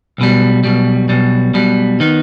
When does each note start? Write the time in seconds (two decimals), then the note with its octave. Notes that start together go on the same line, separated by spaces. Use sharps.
0.18 B1 B2 G3
0.64 B1 B2 G3
1.09 B1 B2 G3
1.54 B1 B2 G3
2.00 D#3 B3 D#4